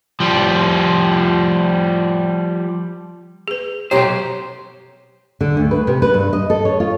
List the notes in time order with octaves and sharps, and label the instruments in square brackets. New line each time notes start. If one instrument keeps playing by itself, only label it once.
[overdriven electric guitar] F3 G3
[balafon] G#4 B4
[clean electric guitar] B1 G2 C5 [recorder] G4 [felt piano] C#5 A#5 [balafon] G5
[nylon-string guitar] D3
D2
B4
C3
B4
G2
D#5
A4
C#5
F4